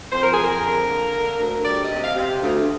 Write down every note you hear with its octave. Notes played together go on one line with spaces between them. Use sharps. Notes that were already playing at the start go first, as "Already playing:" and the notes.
F2 C5
A#4
F2 G#4
A#4
D3
A#3
D3
D2
G3 D5
D#5
C3
F5
C3
D2